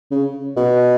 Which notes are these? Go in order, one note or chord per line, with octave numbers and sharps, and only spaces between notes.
C#3
B2